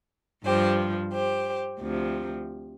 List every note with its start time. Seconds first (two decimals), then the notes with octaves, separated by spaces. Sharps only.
0.45 G2 F3 G4 C5
1.13 G4 C5
1.82 D2 C3 F3